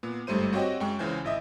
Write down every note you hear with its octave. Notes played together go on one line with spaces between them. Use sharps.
A#2 B3
G1 G#2 G3 A3 C5 D#7
C4 F#4 G4 C#5 D#5 G5
F#2 G#3 G5 C#6
C#2 C#3 E3 C5 G#5 G6
G#1 E4 D#5 E5 D#6